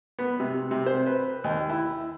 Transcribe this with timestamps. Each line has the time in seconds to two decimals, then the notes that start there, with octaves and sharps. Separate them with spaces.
0.19 B3
0.40 C3
0.71 C3
0.86 C5
1.06 B4
1.44 D#2
1.69 E4